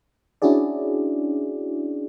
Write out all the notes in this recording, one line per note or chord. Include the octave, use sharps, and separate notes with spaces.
C#4 D4 E4 F#4 G#4 D5